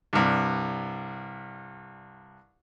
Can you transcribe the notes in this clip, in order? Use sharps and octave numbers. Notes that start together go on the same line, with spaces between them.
C2 G2